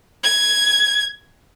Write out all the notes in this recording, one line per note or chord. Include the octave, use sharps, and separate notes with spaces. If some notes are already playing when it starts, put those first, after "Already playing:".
G#6